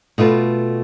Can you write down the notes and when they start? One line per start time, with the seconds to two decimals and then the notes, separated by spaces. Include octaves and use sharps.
0.18 B2 A3 F4 B4